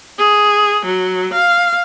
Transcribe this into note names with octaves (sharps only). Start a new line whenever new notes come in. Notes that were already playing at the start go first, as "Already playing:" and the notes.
G#4
F#3
F5